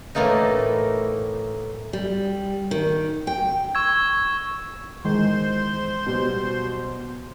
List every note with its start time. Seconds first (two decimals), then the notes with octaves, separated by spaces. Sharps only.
0.15 A2 E3 A3 A#3 D#4
1.93 G3
2.71 D#3
3.27 G5
3.75 C#6 E6 G#6
5.05 D#3 E3 G#3 C5 C6
6.06 B2 F#3 G3